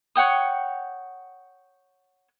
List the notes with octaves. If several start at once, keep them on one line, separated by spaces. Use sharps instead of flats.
C#5 F#5 G5 D#6